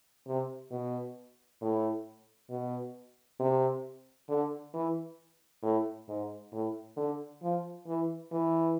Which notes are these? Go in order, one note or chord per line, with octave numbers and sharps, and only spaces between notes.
C3
B2
A2
B2
C3
D3
E3
A2
G#2
A2
D3
F3
E3
E3